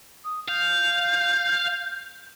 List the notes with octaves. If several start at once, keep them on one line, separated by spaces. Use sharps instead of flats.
D#6
F5 G6